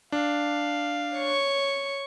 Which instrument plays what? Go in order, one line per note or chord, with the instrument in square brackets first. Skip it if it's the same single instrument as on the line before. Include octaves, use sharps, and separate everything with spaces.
[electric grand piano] D4 [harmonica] F5
[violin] C#5 C#6